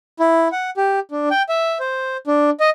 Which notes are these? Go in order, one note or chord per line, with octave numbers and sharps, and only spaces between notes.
E4
F#5
G4
D4
G5
E5
C5
D4
D#5